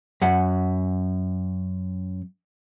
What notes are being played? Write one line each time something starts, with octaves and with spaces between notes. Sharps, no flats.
F#2 F#5